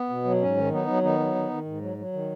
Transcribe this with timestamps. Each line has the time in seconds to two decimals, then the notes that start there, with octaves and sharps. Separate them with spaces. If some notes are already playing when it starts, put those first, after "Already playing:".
Already playing: B3
0.09 B2
0.24 F#3
0.41 G#2 C#4
0.57 D#3
0.72 F#3 B3 D#4
0.87 F#3
1.03 D#3 B3 D#4
1.19 F#3
1.35 D#3
1.50 D#3
1.65 G#2
1.81 F#3
1.98 F#3
2.13 D#3